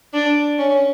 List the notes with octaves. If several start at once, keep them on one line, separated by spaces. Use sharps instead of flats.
D4
C#4